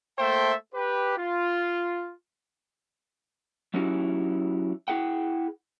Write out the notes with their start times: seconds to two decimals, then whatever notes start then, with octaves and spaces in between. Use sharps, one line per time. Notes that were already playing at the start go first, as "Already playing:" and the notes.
0.19 A3 A#3 A4 C5 E5 G5
0.74 G4 B4
1.17 F4
3.74 F#3 C#4 D#4 E4 F#4 G4
4.88 E4 G#4 F#5 G5